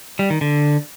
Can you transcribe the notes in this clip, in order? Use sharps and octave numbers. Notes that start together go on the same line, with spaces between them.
G3
D#3
D3